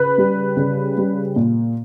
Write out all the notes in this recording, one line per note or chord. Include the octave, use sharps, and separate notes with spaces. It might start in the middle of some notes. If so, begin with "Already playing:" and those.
Already playing: C#3 B4
G3
C#3
G3
A#2